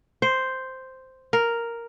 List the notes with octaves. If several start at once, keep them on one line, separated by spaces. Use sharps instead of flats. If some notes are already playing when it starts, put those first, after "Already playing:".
C5
A#4